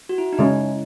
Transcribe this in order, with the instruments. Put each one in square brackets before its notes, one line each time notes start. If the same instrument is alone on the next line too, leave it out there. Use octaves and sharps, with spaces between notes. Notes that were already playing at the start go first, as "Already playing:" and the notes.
[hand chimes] F#4
E4
D#4
[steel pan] C#3 G#3 C#4 [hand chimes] E4